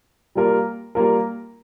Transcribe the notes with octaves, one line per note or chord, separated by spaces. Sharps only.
G3 A#3 F4 A#4
G3 A#3 F4 A#4